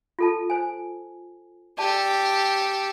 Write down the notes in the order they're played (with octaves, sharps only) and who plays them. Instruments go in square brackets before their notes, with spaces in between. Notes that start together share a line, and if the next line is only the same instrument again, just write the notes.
[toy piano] F4 A4 A5
C5 G#5
[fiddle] G4 A4 [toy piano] D5 A5